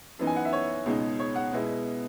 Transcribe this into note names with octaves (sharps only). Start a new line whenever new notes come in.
F#2 E3 B3 D#4
G#5
F#5
E5
C#5
C#2 B2 G#3 D#4
C#5
F#5
B2 G#3 B3 E4